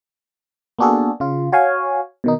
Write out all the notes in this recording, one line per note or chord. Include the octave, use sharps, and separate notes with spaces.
A#3 B3 D4 F#4 G#4 A4
C#3 F4
F#4 C#5 F5 G#5
B2 D#3 D#4